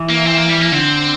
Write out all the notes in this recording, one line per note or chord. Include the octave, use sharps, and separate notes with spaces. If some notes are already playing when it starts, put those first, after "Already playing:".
Already playing: E3
A#3
C4
A#3
G3
A#3
D3 C4